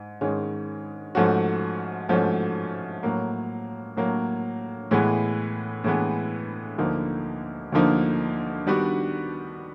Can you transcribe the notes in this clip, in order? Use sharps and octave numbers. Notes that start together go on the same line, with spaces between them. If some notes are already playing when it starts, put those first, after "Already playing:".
Already playing: G#2
G#2 D#3 G#3 C#4
G#2 F3 A3 C#4 F#4
G#2 F3 A3 C#4 F#4
A2 F#3 A#3
A2 F#3 A#3
A2 E3 G#3 B3
A2 E3 G#3 B3
D2 D3 F3 A#3 D#4
D2 D3 F3 A#3 D#4
D#3 G3 B3 D4 F#4